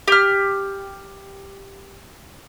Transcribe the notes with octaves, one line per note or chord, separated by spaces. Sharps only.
G4 F6